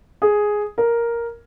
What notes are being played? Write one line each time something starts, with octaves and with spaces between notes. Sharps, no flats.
G#4
A#4